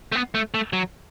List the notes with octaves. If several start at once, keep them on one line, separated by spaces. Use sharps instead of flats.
A3
B3
A3
A3
F#3